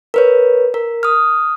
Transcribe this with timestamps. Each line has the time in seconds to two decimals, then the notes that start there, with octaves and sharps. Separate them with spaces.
0.14 A#4 B4 C#5
0.74 A#4
1.03 D#6 F6